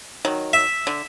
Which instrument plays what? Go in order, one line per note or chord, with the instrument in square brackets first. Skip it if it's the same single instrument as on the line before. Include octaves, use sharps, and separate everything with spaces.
[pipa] D#3 F#3
[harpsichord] E5
[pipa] D3